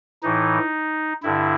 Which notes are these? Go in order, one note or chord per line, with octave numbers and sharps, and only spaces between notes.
A2 E3 D#4
G2 D3 E4